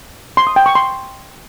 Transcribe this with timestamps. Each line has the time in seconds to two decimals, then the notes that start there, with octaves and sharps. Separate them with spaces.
0.37 C6
0.47 D#6
0.56 G5
0.66 C#6
0.75 C6